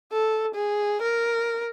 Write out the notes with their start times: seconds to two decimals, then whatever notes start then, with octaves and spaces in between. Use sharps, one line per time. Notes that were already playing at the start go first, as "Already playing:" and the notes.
0.12 A4
0.55 G#4
1.02 A#4